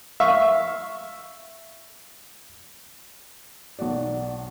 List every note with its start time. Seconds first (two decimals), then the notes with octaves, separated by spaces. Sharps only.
0.20 E5 F5 C#6
3.79 B1 F#3 F#4 D5